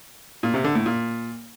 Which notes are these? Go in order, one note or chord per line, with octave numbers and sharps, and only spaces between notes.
A#2
C3
D3
A2
A#2